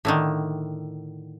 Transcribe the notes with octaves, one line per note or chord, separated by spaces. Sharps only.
A2 D3 D#3